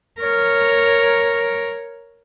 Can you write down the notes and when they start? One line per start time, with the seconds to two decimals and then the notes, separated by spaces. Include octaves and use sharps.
0.20 A#4 C#5